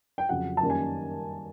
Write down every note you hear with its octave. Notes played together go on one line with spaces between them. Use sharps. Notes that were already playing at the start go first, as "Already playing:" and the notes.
G5
F2 C#3 F#3 F#5
A5
F#2 D#3 G3 A#3 C#4
G#5